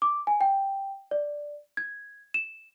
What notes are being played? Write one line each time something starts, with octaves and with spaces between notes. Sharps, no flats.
D6
G#5
G5
D5
G#6
E7